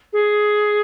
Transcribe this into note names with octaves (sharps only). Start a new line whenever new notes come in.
G#4